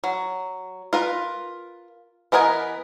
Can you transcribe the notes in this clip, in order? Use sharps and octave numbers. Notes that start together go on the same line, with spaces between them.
F#3
F4 A#4 B4
E3 B3 A#4 D#5 G#5